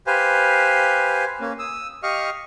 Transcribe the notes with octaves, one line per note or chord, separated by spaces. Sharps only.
G4 B4 C5 F5 G#5
A#3 C#4
D#6 E6
G4 D#5 F5 C#6 D#6 F6